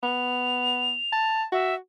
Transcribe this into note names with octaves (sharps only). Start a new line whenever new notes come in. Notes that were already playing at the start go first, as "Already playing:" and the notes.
B3 F7
A5
F#4 E5